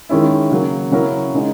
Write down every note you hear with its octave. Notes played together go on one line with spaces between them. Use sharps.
D#3 G#3 C#4 E4
C#3 F#3 A#3
C#3 F#3 C#4 E4 A#4
C#3 G#3 D#4